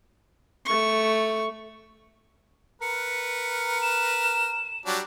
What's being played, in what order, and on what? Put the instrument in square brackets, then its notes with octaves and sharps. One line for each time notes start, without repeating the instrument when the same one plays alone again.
[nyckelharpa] A3 C#6
[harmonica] A#4 B4 [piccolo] C#7
[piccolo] E7
[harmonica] F#3 G3 D4